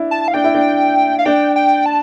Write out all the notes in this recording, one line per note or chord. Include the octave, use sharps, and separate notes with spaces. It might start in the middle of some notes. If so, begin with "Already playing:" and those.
Already playing: D4 E4
A5
F5
D4 G5
E4
D4
F5
D4 G5
G5
A5